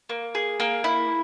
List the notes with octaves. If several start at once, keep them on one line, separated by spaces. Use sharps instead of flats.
A#3
G#4
A#3
E4